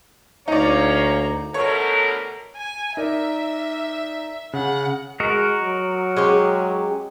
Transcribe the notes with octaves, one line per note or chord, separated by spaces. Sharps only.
D2 A#3 C#4 D#4 C#5 D5 A#5
D2 B2 A4 A#4 C#5
G#5
D#4 A#4 D5 E5
C#3 F#5
G#3 F#4 A#4 D#5
F#3
G#3 C#4 G4